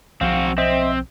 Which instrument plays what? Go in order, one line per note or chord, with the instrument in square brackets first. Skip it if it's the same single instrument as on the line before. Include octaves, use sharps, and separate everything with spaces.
[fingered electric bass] B1 F3 [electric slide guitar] C4 F#4 [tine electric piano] F5
[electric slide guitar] C4 [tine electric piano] C5 D#5 E5